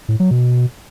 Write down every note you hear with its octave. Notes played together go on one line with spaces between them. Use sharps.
A2
F#3
B2